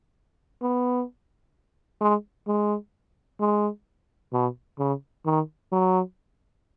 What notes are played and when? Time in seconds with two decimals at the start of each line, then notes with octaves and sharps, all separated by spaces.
0.62 B3
2.01 G#3
2.47 G#3
3.40 G#3
4.33 B2
4.79 C#3
5.25 D#3
5.72 F#3